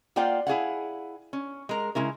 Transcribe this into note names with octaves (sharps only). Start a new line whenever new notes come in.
A#3 F4 C5 D5 F#5 G5
E4 G#4 F5 F#5
C#4
G#3 A#4
C#3 G#3 E4 A#4